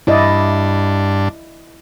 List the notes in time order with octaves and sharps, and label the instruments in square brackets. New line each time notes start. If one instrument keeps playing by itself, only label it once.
[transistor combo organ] G2 D4 [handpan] E4 D5 D#5